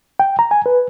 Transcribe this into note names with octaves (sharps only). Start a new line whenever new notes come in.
G5
A#5
G#5
B4